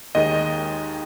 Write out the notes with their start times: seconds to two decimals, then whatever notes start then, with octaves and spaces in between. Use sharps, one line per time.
0.15 D#2 D#3 G#3 D#5